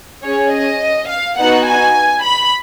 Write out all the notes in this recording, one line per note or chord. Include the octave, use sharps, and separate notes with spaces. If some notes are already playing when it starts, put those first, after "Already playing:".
C#4 G#4 C#5
D#5
F5
B3 D#4 F#4 F#5
G#5
B5